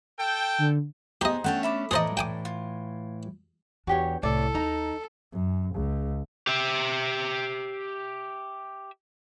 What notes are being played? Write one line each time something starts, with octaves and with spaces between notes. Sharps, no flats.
A4 G5
D3
B3 D#4 G4 G#4 C5 D#5
A3 C#4 D4 F#5 G5 A5
E5 B5 D6
A2 E3 G#4 A4 C5 D5 D#5 A#5
G5 G#5 D6
F4
E2 D4 F#4 G4 C#5
C2 A2 A4 D5
D#2 D#4 A#5
F#2
C#2
G4 E5